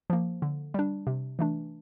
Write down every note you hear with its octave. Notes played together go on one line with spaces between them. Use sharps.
F3 A#3
D3
G3 D4
C3
E3 A3 D4